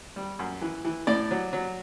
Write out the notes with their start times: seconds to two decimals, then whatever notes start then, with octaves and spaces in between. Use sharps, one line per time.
0.16 G3
0.39 F#2
0.62 E3
0.85 E3
1.07 A2 D5
1.31 F#3
1.53 F#3